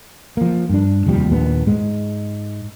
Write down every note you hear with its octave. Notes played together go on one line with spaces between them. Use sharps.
F3 A#3
G2 D4
F1 D#2 F3 G3
D#2 A#2 B3 D4
G#2 G#3